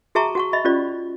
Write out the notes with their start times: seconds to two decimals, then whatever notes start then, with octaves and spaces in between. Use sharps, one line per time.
0.15 F#4 G#4 E5 A5 A#5 C#6
0.35 F#4 F#5 C#6
0.53 D#5 E5 B5
0.65 C#4 F4 G4 D5